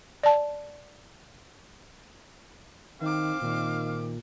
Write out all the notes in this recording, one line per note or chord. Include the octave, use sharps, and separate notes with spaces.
D5 A5
D#3 C4 D#4 F5 D6
A#2 D#3